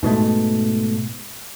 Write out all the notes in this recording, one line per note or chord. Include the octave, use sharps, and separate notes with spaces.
G#2 B2 G#3 A3